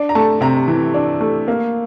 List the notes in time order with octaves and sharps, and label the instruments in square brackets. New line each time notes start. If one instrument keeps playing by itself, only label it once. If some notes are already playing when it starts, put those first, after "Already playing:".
Already playing: [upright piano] D4
A#5
A3 A5
C3 A#5
E3
D4
A3
A#3